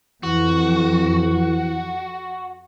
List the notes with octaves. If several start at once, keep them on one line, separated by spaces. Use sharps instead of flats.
F2 E3 F#4